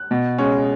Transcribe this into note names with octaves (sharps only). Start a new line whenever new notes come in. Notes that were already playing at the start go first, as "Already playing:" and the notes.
Already playing: F#6
B2
G#3 C#4